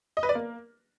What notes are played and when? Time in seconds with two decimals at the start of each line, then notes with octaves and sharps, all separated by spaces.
0.17 D#5
0.23 B4
0.29 D5
0.35 A#3